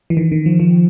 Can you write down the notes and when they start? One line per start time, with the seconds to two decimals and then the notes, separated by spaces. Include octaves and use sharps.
0.10 E3
0.17 D#3
0.32 D#3
0.46 F3
0.60 F3